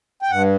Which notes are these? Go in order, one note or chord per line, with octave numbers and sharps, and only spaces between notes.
G5
G2 F#5